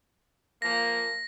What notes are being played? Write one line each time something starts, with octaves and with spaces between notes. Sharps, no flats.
F3 A#3 A#6